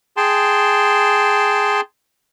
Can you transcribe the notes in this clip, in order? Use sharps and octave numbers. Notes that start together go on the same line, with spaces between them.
G#4 G5 A5 C6